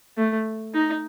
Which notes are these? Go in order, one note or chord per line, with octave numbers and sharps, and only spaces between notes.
A3
D#4